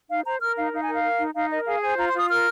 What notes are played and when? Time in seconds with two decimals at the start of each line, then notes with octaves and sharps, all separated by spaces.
0.09 D#4 F5
0.25 C5 A#5
0.40 A#4 F6
0.56 D#4 F5
0.73 D#4 F5
0.83 G#5
0.88 A#4
0.93 F5
1.03 A#4
1.19 D#4
1.34 D#4 F5
1.50 A#4 D#5
1.66 G#4 F5
1.82 C5 G#5
1.97 F4 A#5
2.09 C6
2.13 F4
2.19 D#6
2.29 A#4 F6